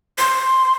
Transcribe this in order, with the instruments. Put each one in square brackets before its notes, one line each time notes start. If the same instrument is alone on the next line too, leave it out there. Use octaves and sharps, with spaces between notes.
[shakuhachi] C6